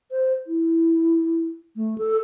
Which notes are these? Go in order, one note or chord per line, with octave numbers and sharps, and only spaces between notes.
C5
E4
A3
A4